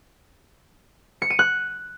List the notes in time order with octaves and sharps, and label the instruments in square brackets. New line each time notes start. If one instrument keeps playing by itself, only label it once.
[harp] C#7
D#7
F#6